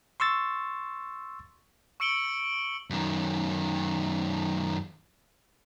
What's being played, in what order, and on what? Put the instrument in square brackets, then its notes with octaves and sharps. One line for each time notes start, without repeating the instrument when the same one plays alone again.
[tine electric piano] C6 C#6 E6 A6
[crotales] C#6 E6 C#7 D7 F#7 G7
[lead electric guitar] F#2 D#3